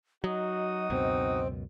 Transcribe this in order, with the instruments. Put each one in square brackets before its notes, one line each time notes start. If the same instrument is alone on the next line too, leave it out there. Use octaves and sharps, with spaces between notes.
[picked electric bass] F#3 [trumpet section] D#4 F#4 D#6 [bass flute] D#5
[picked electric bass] C#2 F#2 B2 [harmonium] C4